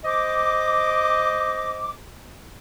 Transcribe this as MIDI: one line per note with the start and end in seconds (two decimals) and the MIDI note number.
0.05 1.93 72
0.05 1.93 75
0.05 1.93 86